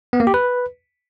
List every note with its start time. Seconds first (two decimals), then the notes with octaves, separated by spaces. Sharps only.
0.13 B3
0.20 A#3
0.27 G4
0.34 B4